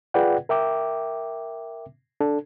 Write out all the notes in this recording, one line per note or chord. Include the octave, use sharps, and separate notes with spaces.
F4 G#4 B4 D5 F#5 G5
A#4 E5 G5 D6
D4 A4